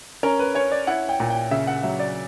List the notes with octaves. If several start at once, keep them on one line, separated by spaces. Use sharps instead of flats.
C#4 A#4
B4
C#4 C#5
D5
E4 F#5
G5
A#2
G5
C#3 E5
F#5
F#3 E5
D5